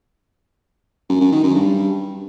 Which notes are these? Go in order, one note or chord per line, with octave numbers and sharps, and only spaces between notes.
F#2
F#2
D#3
F#2
G2